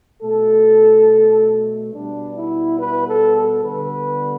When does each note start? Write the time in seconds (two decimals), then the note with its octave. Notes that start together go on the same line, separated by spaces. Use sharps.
0.21 B2 A3 A4
1.92 B2 G3 B3 D4
2.35 E4
2.78 B4
3.07 A4
3.35 A4
3.63 D3 G3 B3 B4